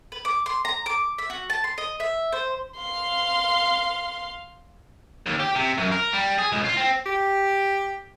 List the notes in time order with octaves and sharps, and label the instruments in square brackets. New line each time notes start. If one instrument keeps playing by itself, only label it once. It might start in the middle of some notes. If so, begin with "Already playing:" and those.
[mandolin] B4
D6
C6
A#5
D6
E5
F#4
A5
C6
D#5
E5
C5
[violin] F5 C6
[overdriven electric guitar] D#2
G4
C3
F#2
A#4
G3
G#4
C#2
F4
C4
[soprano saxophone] G4